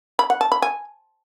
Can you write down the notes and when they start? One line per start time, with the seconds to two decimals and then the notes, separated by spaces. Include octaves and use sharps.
0.19 B5
0.30 F#5
0.41 A5
0.52 B5
0.62 G#5